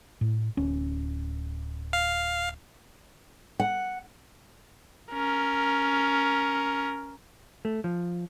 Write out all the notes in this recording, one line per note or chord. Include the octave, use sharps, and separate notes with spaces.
A2
D1 C#4
F5
F#5
C#4 A#4
A3
F3